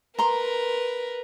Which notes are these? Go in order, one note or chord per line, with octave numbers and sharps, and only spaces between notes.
A#4 B4 A#5 C6